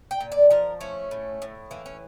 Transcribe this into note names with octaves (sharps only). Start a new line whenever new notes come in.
G5
A#2
D5
F3 A#4
A3 C#4
A2
A2
E3 A#3
C#4